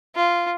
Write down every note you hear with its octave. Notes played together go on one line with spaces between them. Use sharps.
F4